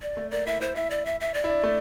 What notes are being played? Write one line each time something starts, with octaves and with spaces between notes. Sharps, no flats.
D5
A3
A#3 D5
E4 E5
E4 C5
E4 E5
D5
E5
E5
D5
E4
D4
A3